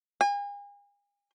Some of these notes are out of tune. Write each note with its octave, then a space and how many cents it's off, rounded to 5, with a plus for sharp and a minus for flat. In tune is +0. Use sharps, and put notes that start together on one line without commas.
G#5 -40